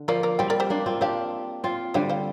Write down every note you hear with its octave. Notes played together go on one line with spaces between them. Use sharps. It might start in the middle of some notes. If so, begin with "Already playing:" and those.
Already playing: D3
F3 A#3 A#4 D5
A#4 D5
G3 C4 D5 G5
A#4 D5
G4 C5
A#3 D4
C4 F4
D4 G4 C5 F5
C4 F4
D3 G3 C5 F5
C5 F5